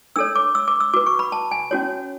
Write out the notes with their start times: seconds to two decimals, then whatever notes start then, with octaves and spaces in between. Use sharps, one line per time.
0.16 D4 A4 C#5 E6
0.36 D6
0.55 E6
0.68 D6
0.80 E6
0.94 F#4 B4 D6
1.06 C#6
1.19 B5
1.32 A5
1.51 G#5
1.71 C#4 F#4 C#5